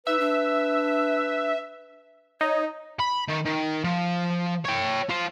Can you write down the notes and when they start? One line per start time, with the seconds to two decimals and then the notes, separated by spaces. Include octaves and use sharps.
0.07 D#4 B4 E5
0.19 D4
2.41 D#4 C#5
3.00 B5
3.29 D#3
3.46 D#3
3.84 F3
4.65 C#5 G5
5.09 F4 C5